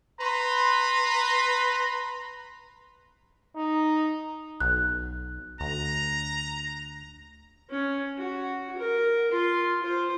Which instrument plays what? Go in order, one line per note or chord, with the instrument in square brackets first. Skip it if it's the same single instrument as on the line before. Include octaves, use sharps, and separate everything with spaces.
[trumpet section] B4 A#5 C6
[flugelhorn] D#4
[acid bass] B1 [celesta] F#6
[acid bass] D2 [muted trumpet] A#5
[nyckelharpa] C#4
F#4
A#4
F4 C6
F4 C5